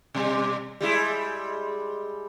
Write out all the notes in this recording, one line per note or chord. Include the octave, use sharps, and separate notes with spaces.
B2 G3
G3 G#3 E4